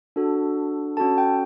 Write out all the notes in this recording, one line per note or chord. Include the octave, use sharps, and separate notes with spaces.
D4 F#4 A4
C#4 F#4 A4 A5
G5